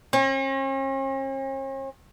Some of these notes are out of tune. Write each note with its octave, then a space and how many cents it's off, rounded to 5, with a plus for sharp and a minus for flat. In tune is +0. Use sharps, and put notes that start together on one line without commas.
C#4 -45